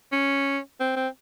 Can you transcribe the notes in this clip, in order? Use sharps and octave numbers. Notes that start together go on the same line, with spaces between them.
C#4
C4
C4